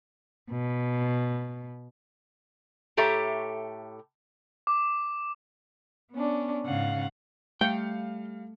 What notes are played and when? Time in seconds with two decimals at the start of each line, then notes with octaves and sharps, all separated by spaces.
0.51 B2
2.97 A2 G4 A4 C#5 E5 A#5
4.67 D6
6.12 B3 C#4 D4
6.65 G#2 C#3 F5 F#5
7.61 G3 A3 F5 G5 C#7